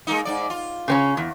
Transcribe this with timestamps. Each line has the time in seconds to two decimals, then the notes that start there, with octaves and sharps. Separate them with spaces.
0.07 G#3 A#3 D#4
0.25 G#2 F#3 D5
0.50 F4
0.88 C#3 C4 C#4
1.17 E2